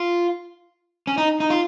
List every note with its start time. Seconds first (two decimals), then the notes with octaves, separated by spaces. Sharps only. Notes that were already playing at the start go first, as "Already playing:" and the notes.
Already playing: F4
1.07 C#4
1.18 D#4
1.40 D#4
1.50 F4